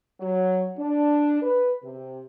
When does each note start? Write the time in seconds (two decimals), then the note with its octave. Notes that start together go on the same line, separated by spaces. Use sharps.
0.20 F#3
0.78 D4
1.42 B4
1.83 C3